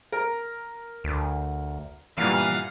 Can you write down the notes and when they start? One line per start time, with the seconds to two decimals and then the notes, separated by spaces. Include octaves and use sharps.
0.12 A#4
1.04 D2
2.18 G2 A#2 E3 F5 F#5